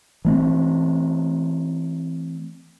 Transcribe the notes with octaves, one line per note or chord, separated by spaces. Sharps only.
E3 A3 C4